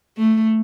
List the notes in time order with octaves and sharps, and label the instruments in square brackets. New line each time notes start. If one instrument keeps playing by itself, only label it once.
[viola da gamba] A3